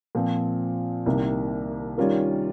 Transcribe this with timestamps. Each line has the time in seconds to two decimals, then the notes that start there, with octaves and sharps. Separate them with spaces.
0.15 A#2 F3 C4
1.06 C2 C3 D#3 A#3
1.98 D#3 G3 C#4 F4 A#4